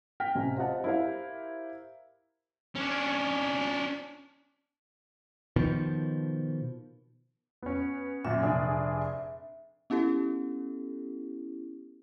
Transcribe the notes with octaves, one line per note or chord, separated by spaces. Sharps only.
G5 F6 A#6 B6
A1 C3 G#5
C4 F4 G4 D#5 F#5 A5
E4 G4 A#4 C5 F5
C#4 D4
B2 D#3 F3
B3 C#4
F#2 A#2 E5
F1 D4 G#4
B3 C#4 E4 G4 A4